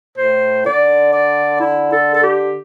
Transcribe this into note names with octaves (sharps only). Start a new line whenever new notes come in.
A2 C5
D3 D5
D5
E4
A4
A4
G4